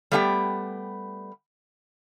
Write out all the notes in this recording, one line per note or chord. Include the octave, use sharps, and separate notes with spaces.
G3 A3 B3 G4 F#5 G5